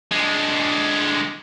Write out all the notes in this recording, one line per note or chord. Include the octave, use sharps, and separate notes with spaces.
D3 G#3